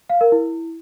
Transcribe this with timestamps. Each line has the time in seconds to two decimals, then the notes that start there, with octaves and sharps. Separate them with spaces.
0.10 F5
0.21 A#4
0.32 E4